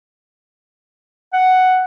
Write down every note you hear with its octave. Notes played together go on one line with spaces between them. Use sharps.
F#5